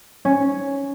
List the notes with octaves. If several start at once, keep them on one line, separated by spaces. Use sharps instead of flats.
C#4